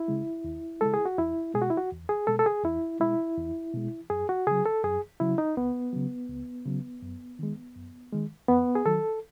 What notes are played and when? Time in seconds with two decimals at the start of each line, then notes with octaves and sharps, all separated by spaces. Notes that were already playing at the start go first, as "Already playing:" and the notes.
Already playing: E4
0.08 C#3 G#3
0.44 D#2
0.81 C#3 G#3 A4
0.94 G#4
1.05 F#4
1.18 E2 E4
1.54 B2 G#3 G#4
1.62 F#4
1.70 E4
1.77 F#4
1.92 E2
2.09 G#4
2.27 B2 G#3 A4
2.39 A4
2.46 G#4
2.64 E2 E4
3.00 B2 G#3 E4
3.37 E2
3.74 B2 G#3
4.10 F#2 G#4
4.29 F#4
4.47 C#3 F#3 G#4
4.66 A4
4.84 F#2 G#4
5.20 C#3 F#3 E4
5.38 D#4
5.57 C#2 B3
5.93 C#3 F#3
6.29 C#2
6.66 C#3 F#3
7.02 F#2
7.39 D#3 G#3
7.76 F#2
8.12 D#3 G#3
8.48 E2 B3
8.75 G#4
8.86 D#3 F#3 A4